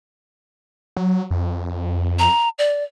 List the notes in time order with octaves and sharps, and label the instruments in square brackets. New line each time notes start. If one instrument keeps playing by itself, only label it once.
[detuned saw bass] F#3
F2
[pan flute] A#5
D5